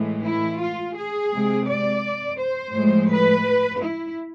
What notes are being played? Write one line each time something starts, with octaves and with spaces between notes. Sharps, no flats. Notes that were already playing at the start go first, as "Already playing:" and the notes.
Already playing: A2 E3 G#3
E4
F4
G#4
C3 G#3
D5
C5
A2 F3 G#3
B4
E4